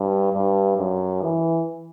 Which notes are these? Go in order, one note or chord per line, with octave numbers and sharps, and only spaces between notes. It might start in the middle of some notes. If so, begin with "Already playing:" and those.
Already playing: G2
G2
F#2
E3